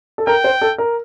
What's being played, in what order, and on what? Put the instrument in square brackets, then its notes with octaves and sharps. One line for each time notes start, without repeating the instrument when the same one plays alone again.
[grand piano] A4
[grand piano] A#4 [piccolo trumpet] G5
[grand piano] C5
A4
A#4